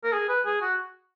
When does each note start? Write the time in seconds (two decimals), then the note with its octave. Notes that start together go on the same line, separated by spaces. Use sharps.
0.04 A#4
0.13 G#4
0.29 B4
0.45 G#4
0.62 F#4